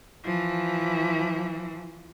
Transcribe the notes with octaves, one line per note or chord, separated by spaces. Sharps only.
E3 F3